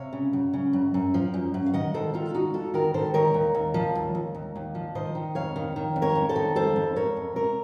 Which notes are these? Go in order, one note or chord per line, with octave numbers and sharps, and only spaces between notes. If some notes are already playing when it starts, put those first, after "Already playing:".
Already playing: C3 C#5 F5
C#3
F#2
C#3
F#2
F#2
F3
F#2
F#2
F5
D#3 D#5 F#5
D#3 A4 C5
D#3 F4 A4
D#3 D#4 F#4
F2 F4 A4
D#3 F#4 A#4
D#3 A4 C5
D#3 A#4 C#5
D#2
D#2
F3
D#2
D#2
D#2
D#2
F3
D#3 C5 D#5
D#3
F2 C#5 F5
D#3
D#3
F2
A#4 C#5
F2
A4 C5
D#3
F2 A4 C5
F2
F2 A#4 C#5
F2
C3 A#4 C#5